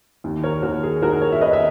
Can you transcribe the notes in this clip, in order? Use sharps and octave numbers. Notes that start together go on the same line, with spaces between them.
D#2
A#4 C#5
D#2 F#4 A#4
G#4
D#3 F#4 A#4
A#4 C#5
E5
D#3 B4 D#5
E5